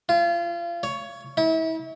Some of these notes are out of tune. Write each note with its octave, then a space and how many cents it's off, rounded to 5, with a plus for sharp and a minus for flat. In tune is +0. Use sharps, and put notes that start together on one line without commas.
F4 -30
C#5 +10
E4 -35